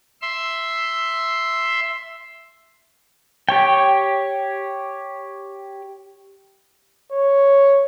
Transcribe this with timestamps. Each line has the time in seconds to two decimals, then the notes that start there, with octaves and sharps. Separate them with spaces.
0.21 E5 C6
3.49 G4 C#5 G5
7.12 C#5